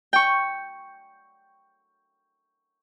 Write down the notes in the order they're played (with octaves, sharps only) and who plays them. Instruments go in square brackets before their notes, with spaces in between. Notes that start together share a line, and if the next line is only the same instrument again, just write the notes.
[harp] G5 C#6